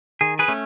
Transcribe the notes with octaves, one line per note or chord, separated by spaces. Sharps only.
D#3 G#4
G#4 B4
A3 C#4